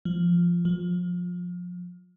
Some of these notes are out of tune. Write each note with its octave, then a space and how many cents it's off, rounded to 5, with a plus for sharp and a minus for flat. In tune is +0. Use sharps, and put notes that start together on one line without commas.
F3 -5
F3 +25